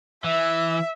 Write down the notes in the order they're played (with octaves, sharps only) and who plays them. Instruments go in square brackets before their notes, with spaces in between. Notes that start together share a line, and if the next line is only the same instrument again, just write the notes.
[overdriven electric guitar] E3 [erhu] E5